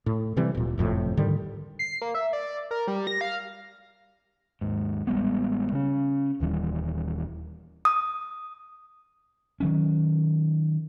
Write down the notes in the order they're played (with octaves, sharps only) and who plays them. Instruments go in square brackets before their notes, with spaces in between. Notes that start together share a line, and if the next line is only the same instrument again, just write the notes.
[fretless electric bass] A2
C3 E3 G3 C4
D1 A#2
F#1 F2 A2 C3
G#2 D3 D#3 G3
[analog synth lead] C7
A#3
E5
D5
A#4
G3
A#6
F5
[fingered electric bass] D#2 G#2
A1 G3 G#3 B3
C#3 C#4
D#1 D#2 E3 G3
[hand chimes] D#6
[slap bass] D#3 F#3 C#4